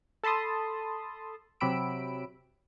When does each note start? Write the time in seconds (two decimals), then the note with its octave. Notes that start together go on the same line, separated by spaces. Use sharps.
0.23 A4 A5 B5 C6 D#6
1.60 C3 F#3 G4 B5 E6 D7